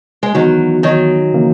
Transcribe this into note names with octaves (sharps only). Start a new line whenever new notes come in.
G#3
D#3 E3 F#3 B3 D#4 F#4
D#3 F#3
C#3 E3 A#3 C#4